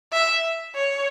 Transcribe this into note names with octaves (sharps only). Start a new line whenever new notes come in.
E5
C#5